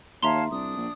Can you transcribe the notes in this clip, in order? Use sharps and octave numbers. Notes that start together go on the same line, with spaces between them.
D#2 C#5 E5 F5 A5 A#5 C6
C2 D4 D#6
A#1